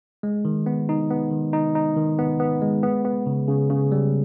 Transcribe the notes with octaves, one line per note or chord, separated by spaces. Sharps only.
G#3
D#3
B3
D#4
B3
D#3
D#4
D#4
D#3
B3
B3
G#3
B3
B3
C#3
C#3
C#3
G3